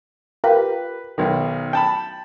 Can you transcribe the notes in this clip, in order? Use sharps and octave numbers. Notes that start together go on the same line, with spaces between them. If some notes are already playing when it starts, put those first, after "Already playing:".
F4 G4 A#4 B4
B1 D#3
G5 A5 B5